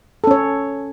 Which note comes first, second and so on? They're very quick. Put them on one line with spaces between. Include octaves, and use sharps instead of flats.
A4 C#4 C#5